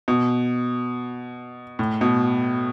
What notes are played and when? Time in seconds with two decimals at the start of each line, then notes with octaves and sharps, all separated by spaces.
0.08 B2
1.79 A2
2.01 B2